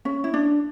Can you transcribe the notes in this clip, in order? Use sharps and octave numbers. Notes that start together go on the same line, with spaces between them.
C#4
E4
D4